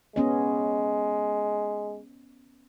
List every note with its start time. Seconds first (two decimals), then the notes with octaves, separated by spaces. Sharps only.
0.16 G#3 B3 C#4 D#5